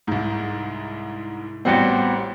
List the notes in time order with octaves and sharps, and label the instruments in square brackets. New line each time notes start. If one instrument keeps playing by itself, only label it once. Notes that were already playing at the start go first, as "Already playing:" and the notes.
[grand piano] C2 G#2
[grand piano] A1 G3 C4 [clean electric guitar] B3 F#4 G4